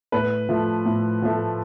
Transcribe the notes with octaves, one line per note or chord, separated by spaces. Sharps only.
A2 B4
F3 A3
A2
F3 A3